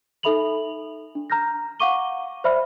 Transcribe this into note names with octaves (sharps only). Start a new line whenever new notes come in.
D#4 A4 E5 B5 F7 F#7
D4
A#5 F6 G6 A#6
F5 F#5 C#6 D6 D#7 G7
C5 D5 E5 B5 F6